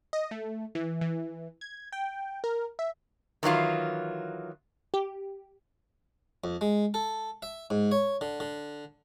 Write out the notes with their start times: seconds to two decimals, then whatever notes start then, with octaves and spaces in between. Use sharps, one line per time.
0.13 D#5
0.31 A3
0.75 E3
1.01 E3
1.61 G#6
1.92 G5
2.44 A#4
2.79 E5
3.43 D#3 E3 F#3 F4
4.94 G4
6.44 F2
6.61 G#3
6.94 A4
7.42 E5
7.70 G#2
7.92 C#5
8.21 D3
8.40 D3